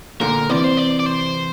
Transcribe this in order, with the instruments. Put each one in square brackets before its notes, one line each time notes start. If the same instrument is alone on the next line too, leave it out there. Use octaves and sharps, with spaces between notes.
[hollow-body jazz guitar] A#2 D3 [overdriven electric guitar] A#4
[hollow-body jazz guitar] C3 E3 [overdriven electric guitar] D5
[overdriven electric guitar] C5
D5
D5
C5